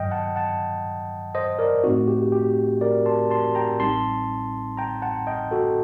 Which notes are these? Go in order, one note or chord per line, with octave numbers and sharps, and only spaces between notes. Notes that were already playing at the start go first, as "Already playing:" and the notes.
Already playing: G2 D#3 F#3 D#5 G5
F#5 A5
F#5 A5
C5 D#5
A#4 D5
A2 A3 C4 D#4 F#4
G4
G4
A#4 D5
A5 C6
A5 C6
G5 A#5
A1 A2 G3 C4 D#4 A5 C6
G5 A#5
F#5 A5
D#5 G5
F#4 A4